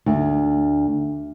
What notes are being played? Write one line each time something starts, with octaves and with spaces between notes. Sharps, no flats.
D2